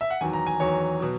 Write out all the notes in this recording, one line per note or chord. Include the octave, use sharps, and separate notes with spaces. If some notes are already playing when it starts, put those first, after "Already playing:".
E5
F#5
E2 D#3 F#3 G#5
A#5
G#5
E2 D#3 F#3 C#5
B2 F#3